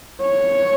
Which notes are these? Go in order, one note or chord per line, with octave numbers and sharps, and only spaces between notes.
C#5